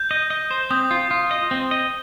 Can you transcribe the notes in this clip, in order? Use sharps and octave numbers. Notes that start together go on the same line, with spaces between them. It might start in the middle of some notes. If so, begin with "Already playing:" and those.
Already playing: G6
D#5
D#5
C5
C4 D#6
F4
F4
D#5
C4
D#5